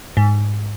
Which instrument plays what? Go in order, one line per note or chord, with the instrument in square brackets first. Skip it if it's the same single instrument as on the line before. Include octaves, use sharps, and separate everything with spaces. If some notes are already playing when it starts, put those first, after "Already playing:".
[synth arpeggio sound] G#2